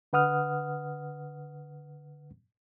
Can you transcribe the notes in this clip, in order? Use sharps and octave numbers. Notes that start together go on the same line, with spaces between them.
D3 B4 F#5 D#6 F6